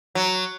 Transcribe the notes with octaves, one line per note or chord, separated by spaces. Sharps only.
F#3